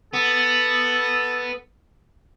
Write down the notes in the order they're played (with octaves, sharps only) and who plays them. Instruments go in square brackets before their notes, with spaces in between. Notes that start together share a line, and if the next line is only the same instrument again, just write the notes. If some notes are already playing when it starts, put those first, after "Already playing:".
[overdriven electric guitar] B3 [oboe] A4